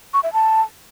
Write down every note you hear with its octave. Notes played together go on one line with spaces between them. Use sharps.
C#6
E5
A5